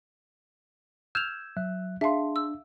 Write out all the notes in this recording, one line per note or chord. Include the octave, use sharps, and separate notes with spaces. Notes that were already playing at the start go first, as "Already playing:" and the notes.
E6 F6 G6 G#6 E7 F7
F#3 E5 F#6
D4 G#4 E5 F5 A5 C6
E6